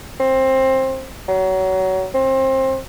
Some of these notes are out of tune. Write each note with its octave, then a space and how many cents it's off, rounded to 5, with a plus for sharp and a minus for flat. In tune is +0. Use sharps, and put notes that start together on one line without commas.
C4 +20
F#3 +25
C4 +25